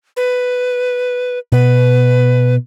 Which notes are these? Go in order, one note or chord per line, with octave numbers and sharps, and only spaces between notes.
B4
B2 B4